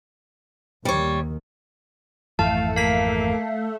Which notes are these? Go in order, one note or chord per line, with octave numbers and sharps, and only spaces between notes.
D#2 D#3 G3 C#5
G#1 F2 E3 A3 F5 A5
A#3 F5 B6